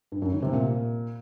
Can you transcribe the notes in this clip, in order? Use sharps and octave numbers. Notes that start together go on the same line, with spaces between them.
G2
F#2
D#3
C3
A#2